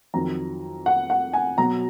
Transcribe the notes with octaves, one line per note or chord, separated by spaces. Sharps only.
F2 D#3 F#3 A#5
F#5
F#5
G#5
B2 F#3 A#5